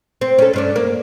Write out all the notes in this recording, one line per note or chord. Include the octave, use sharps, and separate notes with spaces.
C4
C#4 A4
G2 C#4 D4
A#3